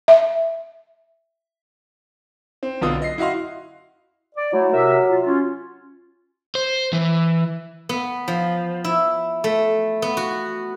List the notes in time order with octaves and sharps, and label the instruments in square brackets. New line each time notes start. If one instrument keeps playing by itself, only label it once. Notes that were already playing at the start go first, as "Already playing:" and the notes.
[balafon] E5
[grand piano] C4
B1 D3 B3 F4 D#6
D#5 C7
E4 F#4 D#5 F5 C6
[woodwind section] D5
[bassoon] F#3 [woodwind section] A3 E4
[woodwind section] C3 A#4 E5
F4
C#4 F4 F#4
[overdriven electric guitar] C5
E3
[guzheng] B3
F3
E4
A3
B3
F#4